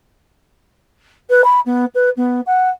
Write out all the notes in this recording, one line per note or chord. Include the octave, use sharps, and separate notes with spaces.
B4
B5
B3
B4
B3
F#5